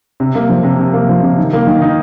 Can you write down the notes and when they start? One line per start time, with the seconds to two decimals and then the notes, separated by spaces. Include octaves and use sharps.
0.20 C3
0.35 A#3
0.49 F3
0.64 C3
0.79 C3
0.93 A#3
1.09 F3
1.23 C3
1.38 D#3
1.53 A#3
1.67 D#3
1.82 D#4